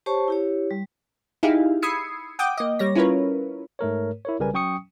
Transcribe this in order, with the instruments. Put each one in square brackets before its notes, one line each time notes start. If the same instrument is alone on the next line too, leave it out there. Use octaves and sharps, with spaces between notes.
[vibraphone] G4 C5 C#5 A5 C#6
E4 G4 C#5
G3
[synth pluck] D#4 E4 G4 G#4 F5
B5 D#6 E6 G#6 C7 C#7
F#5 G5 D6 D#6 G6
A#3 D#5
G3 C#5 A#6
C#4 E4 F4 A#4 B4 C#5
[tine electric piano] G#2 A3 A#4 C#5
E4 A#4 C#5
B1 C#3 G3 A#4 B4 G#5
F#3 C#4 G5 C#6 D#6 C#7